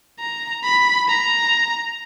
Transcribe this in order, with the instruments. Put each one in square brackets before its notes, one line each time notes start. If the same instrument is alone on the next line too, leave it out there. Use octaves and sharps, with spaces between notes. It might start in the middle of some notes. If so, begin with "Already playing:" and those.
[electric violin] A#5
B5
A#5